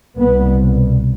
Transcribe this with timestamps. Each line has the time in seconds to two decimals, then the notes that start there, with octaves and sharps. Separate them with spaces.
0.17 C2 B2 B3